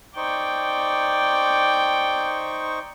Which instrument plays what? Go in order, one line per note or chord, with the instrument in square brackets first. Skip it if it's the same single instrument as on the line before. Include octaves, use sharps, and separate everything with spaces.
[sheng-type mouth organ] D#4 C5 C#6 [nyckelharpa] D5 G5